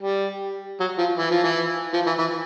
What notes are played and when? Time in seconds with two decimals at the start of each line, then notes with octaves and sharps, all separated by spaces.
0.03 G3
0.80 F#3
0.98 F3
1.18 E3
1.31 F3
1.44 E3
1.94 F3
2.07 E3
2.19 E3